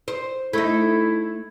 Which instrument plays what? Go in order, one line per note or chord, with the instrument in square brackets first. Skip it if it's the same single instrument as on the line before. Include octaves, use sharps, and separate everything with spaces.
[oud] C5
[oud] A3 D#4 [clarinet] E4